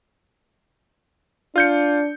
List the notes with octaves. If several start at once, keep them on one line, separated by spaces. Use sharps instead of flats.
D4 F4 G6 C#7